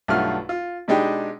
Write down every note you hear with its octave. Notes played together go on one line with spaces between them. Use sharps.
B1 G2 A3 F4 F#5 F6
F4
B2 G#3 D4 D#4 G4 G5